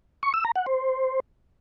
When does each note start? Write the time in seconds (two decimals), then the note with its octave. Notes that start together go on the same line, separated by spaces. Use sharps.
0.23 C#6
0.34 E6
0.45 A#5
0.56 F#5
0.66 C5